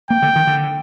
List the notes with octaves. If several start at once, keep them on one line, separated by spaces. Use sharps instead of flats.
A#3 G5
D3
D#3
D3